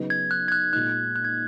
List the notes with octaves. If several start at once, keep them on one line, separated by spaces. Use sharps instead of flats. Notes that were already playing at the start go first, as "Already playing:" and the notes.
Already playing: C#3 F#3 B3 D#4
G#6
F#6
G#6
F#6
A#2 G#3 D#4 F#6
F#6
G#6